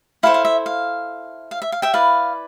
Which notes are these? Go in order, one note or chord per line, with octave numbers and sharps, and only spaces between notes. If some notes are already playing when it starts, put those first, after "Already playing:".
E4 A4 C5 F5
F5
E5
F5
F5
E5
F5
E5 G5
E4 B4 D5 F5